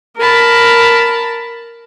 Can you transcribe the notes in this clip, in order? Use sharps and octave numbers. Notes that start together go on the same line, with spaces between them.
A#4 A5 B5